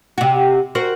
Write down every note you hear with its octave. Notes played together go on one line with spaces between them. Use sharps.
C3 F#4
F#4 A#4 C5